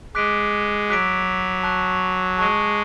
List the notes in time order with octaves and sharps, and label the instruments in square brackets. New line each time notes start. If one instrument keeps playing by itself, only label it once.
[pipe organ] G#3 [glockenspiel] D6 F#6 B6 D7
[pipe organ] F#3 [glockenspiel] D6 F#6 B6 D7
[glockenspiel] A5 C#6 F#6
[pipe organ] G#3 [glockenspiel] A5 C#6 F#6